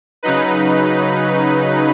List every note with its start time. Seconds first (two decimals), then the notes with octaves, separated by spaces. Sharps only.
0.23 C#3 F#3 D#4 B4